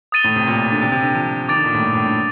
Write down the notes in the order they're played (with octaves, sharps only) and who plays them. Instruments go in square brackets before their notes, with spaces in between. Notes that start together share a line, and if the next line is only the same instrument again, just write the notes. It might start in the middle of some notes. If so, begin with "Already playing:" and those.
[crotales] D#6 A6 D#7 G7
[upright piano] A2
C3
A#2
D3
C3
C3
D3
F3
[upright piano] D#3 [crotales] D6 A6 D7 F7
[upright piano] D3
A#2
A2
G2
A2
G2